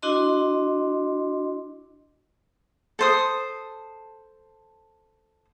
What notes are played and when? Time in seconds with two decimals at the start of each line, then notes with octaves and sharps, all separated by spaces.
0.02 D4 E4 F#4 D#5 C6
2.99 A4 C5 D#6